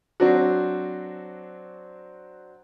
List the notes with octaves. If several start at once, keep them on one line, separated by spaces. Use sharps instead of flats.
F#3 C4 D4 F#4